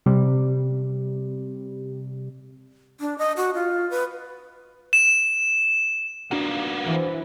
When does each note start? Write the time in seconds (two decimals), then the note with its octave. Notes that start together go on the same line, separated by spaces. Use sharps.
0.06 C3 G3
3.00 D4
3.18 D#5
3.37 F#4
3.55 F4
3.90 B4
4.93 E7
6.31 A#3 B3 D4 D#4 F4 F#4 F#5
6.86 E3 C5